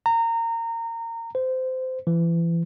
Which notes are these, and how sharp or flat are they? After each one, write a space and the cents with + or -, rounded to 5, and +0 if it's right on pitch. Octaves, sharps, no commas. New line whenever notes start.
A#5 -25
C5 -20
E3 +30